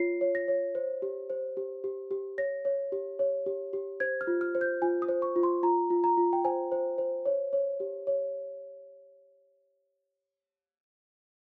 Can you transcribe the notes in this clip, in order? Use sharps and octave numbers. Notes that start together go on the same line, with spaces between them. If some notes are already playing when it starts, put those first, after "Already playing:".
Already playing: F4 C#5 C7
C#5
A#6
C#5
C5
G4
C5
G4
G4
G4
C#5 A#6
C#5
G4
C#5
G4
G4
C5 G#6
F6
F4
F6
C5
G6
F4 G#5
D#6
C5
C#6
F4
C6
F4 A#5
F4
A#5
F4
G5
C5 G#5
C5
C5
C#5
C#5
G4
C#5